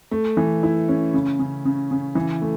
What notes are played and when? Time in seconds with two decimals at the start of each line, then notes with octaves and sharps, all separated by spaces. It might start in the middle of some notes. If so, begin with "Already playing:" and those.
0.11 A3
0.37 E3
0.63 E4
0.88 C#4
1.14 C#3
1.39 C#3
1.65 C#3
1.91 C#3
2.15 E3
2.41 A3